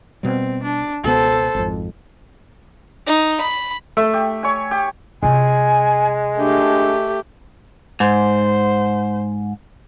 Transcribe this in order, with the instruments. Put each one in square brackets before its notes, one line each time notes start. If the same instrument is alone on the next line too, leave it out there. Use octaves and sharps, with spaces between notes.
[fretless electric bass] B2 G3 [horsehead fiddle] C4
[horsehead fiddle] D4
[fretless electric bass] C#2 B2 B3 [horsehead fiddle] A4 C5
[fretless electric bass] G#1 F2
[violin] D#4
B5
[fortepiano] A3 [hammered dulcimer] E5
[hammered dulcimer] G4
C#5 G#5
G4
[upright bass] C3 F4 [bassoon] G#3 [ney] G#5
[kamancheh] A3 G4 [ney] D4
[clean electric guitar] G#2 [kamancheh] C5